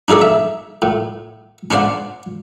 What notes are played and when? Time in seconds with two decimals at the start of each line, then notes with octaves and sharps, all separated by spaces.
0.08 D4 D#4 G#4 A4 D5
0.22 E5
0.82 A2
1.71 C#4 D4 C5 D5 F#5